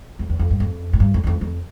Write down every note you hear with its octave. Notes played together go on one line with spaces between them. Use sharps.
F2
E2
F2
G2
F2
A2
G2
F2
E2
F2
F2